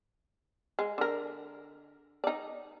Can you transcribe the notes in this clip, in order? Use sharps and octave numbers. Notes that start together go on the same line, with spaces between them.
G#3
D3 A#4
D#4 D5